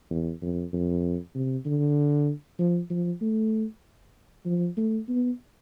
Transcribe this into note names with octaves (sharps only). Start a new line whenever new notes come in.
E2
F2
F2
C3
D3
F3
F3
A3
F3
A3
B3